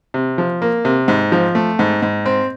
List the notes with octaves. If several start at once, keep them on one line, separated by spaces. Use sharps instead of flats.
C3
F3
A#3
C3
G#2
F3
A3
G#2
G#2
C4